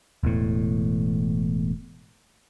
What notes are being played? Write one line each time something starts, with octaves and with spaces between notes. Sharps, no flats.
E1 E2 A2